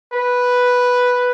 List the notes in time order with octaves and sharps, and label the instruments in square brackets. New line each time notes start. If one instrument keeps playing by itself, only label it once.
[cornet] B4